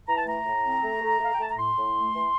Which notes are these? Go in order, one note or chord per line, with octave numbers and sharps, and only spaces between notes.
E3 A#5
A5
A3 A#5
A2
C4
A3
A3
A3 F5
G5
A3 A5
A#5
A2 C6
A2
A3
E3